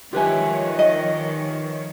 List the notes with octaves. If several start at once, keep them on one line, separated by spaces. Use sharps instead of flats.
D#3 F3 F4 G4 B4 C#5 E5 G#5
D#5